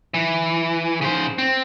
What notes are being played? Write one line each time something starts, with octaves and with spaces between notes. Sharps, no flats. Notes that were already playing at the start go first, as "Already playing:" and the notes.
E3
C#3 C5
C4